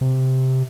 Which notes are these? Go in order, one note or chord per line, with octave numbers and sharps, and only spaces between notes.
C3